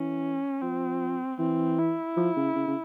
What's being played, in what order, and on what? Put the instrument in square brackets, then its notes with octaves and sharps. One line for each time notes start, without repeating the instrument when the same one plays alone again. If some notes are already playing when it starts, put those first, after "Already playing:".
Already playing: [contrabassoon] E3 [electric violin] C#4
[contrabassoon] F3 [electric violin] C4
[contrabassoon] E3 [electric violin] C4
[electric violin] E4
[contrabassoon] F3
C#3
C#3
C#3